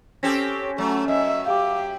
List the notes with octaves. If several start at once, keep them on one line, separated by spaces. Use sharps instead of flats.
C4 C#4 G4 A4 A#6 B6
F#3 A3
F#2 D#5 E5
G4 F5 D6